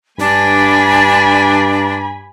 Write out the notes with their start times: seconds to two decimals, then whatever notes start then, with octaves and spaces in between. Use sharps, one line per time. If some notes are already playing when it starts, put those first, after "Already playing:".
0.20 G2 D4 G#5 B5